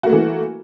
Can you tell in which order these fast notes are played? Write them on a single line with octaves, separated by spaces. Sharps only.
F#4 A#3 A3 E3